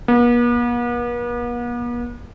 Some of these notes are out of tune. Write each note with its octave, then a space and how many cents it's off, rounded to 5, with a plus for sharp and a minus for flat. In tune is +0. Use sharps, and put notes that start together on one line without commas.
B3 -45